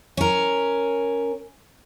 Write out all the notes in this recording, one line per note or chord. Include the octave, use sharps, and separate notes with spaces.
C#4 A#4